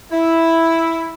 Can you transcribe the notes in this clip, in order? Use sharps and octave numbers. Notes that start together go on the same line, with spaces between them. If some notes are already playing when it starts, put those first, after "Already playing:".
E4